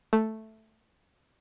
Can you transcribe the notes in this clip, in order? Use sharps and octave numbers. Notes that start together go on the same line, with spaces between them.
A3